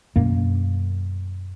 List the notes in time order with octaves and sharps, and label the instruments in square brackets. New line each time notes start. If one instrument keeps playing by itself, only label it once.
[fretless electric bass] F#2 B2 A#3